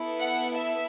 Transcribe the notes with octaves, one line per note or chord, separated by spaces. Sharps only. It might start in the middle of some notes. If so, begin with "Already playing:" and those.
Already playing: B3 E4 A4
F#5
E5